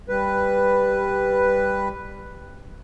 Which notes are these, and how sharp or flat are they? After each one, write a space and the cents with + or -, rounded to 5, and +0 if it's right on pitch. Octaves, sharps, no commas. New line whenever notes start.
G3 +5 B4 +0